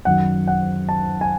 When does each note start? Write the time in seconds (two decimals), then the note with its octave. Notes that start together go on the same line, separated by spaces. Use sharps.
0.05 F#2 D#3 F#3 F#5
0.47 F#5
0.89 A5
1.21 G#5